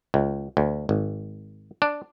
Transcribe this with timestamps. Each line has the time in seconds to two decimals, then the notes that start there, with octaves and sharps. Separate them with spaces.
0.14 C#2
0.57 D2
0.89 G#1
1.82 D4